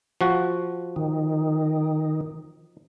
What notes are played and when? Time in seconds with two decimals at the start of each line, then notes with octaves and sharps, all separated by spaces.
0.21 F3 F#4
0.96 D#3